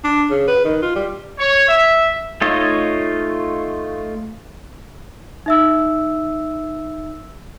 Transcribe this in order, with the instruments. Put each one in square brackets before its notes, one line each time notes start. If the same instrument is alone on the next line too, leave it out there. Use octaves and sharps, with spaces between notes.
[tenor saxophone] D4
C#3
B4
D#3
F4
G3
[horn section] C#5
E5
[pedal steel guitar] A3 D#4 F4 C#5 D#5
[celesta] D#4 E5 E6